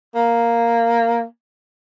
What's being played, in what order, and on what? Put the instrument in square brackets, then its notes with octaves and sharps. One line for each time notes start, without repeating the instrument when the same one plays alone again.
[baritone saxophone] A#3